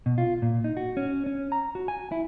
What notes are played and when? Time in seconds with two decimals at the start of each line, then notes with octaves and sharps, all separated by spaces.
0.06 B2
0.18 F4
0.42 A#2
0.64 D#4
0.77 F#4
0.97 C#4
1.26 C#4
1.52 A#5
1.75 F#4
1.88 G#5
2.12 E4